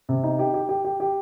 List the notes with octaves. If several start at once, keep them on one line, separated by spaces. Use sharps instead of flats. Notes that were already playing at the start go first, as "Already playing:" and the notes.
C3
D#4
G4
G4
G4
G4
G4